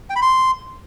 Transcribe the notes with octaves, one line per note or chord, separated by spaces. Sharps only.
G5
B5
C6